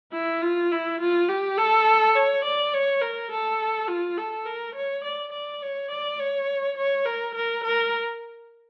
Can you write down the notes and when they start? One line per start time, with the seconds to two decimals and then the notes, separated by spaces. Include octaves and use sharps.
0.12 E4
0.41 F4
0.71 E4
1.00 F4
1.28 G4
1.57 A4
2.15 C#5
2.44 D5
2.73 C#5
3.01 A#4
3.30 A4
3.88 F4
4.17 A4
4.45 A#4
4.75 C#5
5.04 D5
5.32 D5
5.62 C#5
5.90 D5
6.19 C#5
6.77 C#5
7.05 A#4
7.34 A#4
7.64 A#4